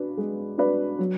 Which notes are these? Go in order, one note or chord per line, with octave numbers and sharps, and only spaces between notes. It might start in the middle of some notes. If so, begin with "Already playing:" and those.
Already playing: D4 F#4 B4 D5
G#3
D4 F#4 B4 D5
F#3